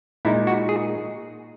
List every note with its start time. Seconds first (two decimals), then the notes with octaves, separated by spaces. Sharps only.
0.25 A#2 G#3 D#4 E4
0.47 F#4
0.69 G#4